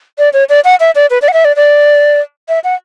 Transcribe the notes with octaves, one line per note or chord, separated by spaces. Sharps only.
D5
C#5
D5
F#5
E5
D5
B4
D5
F#5
E5
D5
D5
E5
F#5